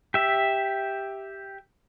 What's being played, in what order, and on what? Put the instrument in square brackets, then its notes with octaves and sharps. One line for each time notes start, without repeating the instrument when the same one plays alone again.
[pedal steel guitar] G4 E5